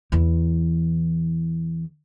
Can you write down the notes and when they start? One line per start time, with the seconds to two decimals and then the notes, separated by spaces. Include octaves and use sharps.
0.12 E2 E3